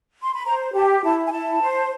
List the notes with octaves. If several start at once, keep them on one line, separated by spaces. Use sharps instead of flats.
C6
B5
C5 A#5
G4 A5
E4 A5
G#5
E4 A5
C5